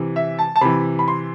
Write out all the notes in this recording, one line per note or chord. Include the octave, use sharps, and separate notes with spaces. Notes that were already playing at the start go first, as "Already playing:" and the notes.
Already playing: C3 E3
E5
A5
A5
C3 E3 B5
B5
C6